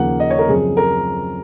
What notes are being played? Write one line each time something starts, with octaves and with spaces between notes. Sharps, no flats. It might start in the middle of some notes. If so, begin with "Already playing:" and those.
Already playing: D#2 C#3 F3 A#3 F#5
D#5
C#5
A#4
F#2 C#3 F3 C4 G#4
A#4